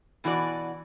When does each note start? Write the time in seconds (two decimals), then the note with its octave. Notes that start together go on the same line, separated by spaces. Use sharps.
0.24 B2 E3 F#4 A#4 D5